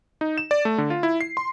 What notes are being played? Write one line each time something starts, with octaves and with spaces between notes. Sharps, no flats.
D#4
E7
D5
A3
D3
F4
E4
C7
C6